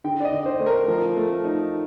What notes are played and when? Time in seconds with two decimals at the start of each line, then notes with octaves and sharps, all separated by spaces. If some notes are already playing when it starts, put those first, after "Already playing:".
0.04 D3 G5
0.20 D5
0.25 D#5
0.33 D3
0.46 C5
0.60 A3
0.66 A#4
0.88 F3
1.17 A3
1.45 D#4